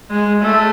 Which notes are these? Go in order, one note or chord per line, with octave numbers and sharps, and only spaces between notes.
G#3
A3